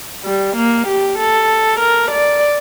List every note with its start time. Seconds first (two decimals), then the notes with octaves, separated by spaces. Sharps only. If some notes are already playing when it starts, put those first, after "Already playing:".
0.25 G3
0.56 A#3
0.87 G4
1.18 A4
1.80 A#4
2.11 D5